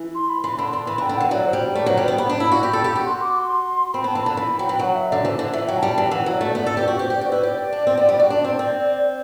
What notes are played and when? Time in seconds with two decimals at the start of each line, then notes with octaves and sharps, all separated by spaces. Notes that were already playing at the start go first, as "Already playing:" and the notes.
Already playing: E3
0.15 C6
0.29 B5
0.44 E3 C6
0.53 B5
0.59 D3 C6
0.73 D3 C6
0.87 E3 B5
0.98 D3
1.02 G5
1.09 D3
1.17 E3 F#5
1.31 F#3 D5
1.46 C5
1.53 G3
1.60 C5
1.75 A3 D5
1.86 F#3 B4
1.97 G3
2.04 B3 C5
2.18 B3 B5
2.29 D4
2.40 E4
2.52 F#4
2.63 G4
2.73 A4
2.84 G4
2.96 F#4
3.06 C6
3.21 D6
3.35 C6
3.93 C4 B5
4.04 B3 A5
4.15 E3
4.22 D3 B5
4.37 E3 B5
4.59 F#3 G5
4.69 E3
4.79 F#3 F#5
4.95 E5
5.10 D3 D5
5.25 E3 C5
5.39 D3
5.53 E3 E5
5.68 F#3 G5
5.79 A5
5.83 G3
5.91 A5
5.98 E3 G5
6.11 E3 F#5
6.26 F#3
6.33 D5
6.41 A3
6.55 B3 D5
6.66 A4
6.77 G4 B4
6.88 F#4
6.99 G4 C5
7.10 G4 D5
7.21 F#4
7.28 E4 B4
7.43 G4 D5
7.73 D4
7.87 C4
7.97 B3
8.09 G3
8.20 F#4
8.30 D4 D5
8.44 C4
8.59 C4